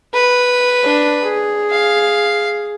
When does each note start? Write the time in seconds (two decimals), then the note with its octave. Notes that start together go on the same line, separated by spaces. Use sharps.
0.14 B4
0.84 D4
1.23 G#4
1.71 F5